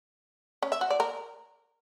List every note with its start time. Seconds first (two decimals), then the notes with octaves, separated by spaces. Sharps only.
0.62 C#4
0.72 E5
0.81 F#4
0.90 D5
1.00 A#4